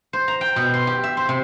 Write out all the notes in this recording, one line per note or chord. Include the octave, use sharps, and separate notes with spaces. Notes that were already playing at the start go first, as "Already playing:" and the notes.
C5
A#5
G5
B2
C6
G4
E5
C5
C3